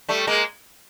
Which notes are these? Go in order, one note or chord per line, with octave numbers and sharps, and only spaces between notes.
G3 A3
G#3 A#3